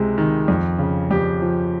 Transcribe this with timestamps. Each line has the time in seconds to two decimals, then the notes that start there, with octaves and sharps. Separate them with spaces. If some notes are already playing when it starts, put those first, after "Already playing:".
Already playing: C#2 C3 G#3
0.18 D#3
0.48 F2
0.79 C#3
1.11 F2 G4
1.42 F3